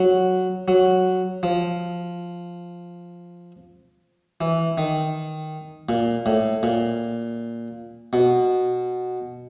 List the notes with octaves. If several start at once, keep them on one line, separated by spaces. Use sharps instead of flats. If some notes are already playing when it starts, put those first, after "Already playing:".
Already playing: F#3
F#3
F3
E3
D#3
A#2
A2
A#2
B2